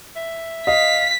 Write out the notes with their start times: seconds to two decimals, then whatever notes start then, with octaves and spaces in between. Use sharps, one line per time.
0.15 E5
0.67 D#5 F5 B6